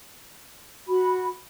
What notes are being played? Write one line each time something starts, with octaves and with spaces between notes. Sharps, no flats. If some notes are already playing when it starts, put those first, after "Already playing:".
F#4 B5